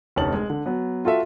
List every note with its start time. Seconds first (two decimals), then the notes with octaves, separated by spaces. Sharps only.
0.16 F1 D2 C#4 D#4 A5 F#7
0.34 G#3
0.50 D3
0.66 F#3 B3
1.05 F4 F#4 A4 E5